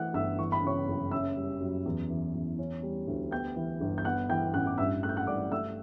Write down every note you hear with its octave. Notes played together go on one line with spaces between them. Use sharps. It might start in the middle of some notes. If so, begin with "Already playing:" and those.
Already playing: E3 A3 F#5 F#6
G1 E5 E6
E3 C#6
B5
C#3 C#5 C#6
F#1
C#4 E5 E6
G3
F#2
E2
E3
E2
C#4
G3
D2
B3 G5 G6
E3
G1
G6
B3 F#5 F#6
E3 G5 G6
A1 F#5 F#6
D6
G2 E5 E6
A3 F#6
G6
F#5 F#6
G2 D5 D6
A3 E5 E6